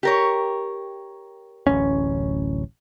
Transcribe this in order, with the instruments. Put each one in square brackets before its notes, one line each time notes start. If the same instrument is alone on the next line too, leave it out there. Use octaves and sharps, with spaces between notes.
[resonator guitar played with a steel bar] G4 A#4 C#5
[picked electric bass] D1 A1 C#4